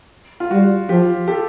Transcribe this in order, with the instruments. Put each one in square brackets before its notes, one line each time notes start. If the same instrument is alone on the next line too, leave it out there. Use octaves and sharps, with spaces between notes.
[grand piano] F4
[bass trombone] G3 [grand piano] F#4
[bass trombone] F3 [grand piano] F4 G4
[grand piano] G4 A4